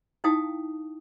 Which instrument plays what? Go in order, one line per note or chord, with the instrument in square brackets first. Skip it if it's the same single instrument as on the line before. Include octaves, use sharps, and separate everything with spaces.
[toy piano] D#4 E4 F5 G5 A5 D#6